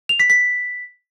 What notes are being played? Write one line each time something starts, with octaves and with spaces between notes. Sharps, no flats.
F7
B6
B6